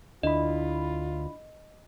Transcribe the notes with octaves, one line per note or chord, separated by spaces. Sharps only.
D2 D4 E4 F4 D#5 B5